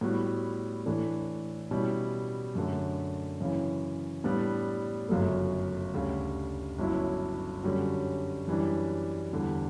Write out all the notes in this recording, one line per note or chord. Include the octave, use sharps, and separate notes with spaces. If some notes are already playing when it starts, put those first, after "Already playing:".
A2 G3 B3 F#4
A2 E3 A3 D4
B2 G3 C#4 E4
F#2 D3 A3
F#2 C#3 E3
A2 G3 B3 D4
G1 F#2 C#3 F#3 A3
D2 C#3 G3
G1 G2 F#3 C#4 E4
F#2 D3 G3 C#4 F#4
F#2 E3 G3 D4
E2 D3 G3